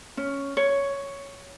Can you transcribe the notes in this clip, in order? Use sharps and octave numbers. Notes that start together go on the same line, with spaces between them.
C#4
C#5